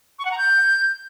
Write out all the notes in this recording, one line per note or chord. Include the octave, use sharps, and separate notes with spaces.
C#6
F#5
A#5
G6